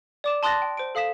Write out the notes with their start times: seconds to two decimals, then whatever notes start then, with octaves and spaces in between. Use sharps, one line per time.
0.24 D5 D6 E7
0.43 A5 C6 D#6 F#6 A6 A#6
0.62 G5
0.77 C5 D7
0.95 A4 F5 D#6 B6 E7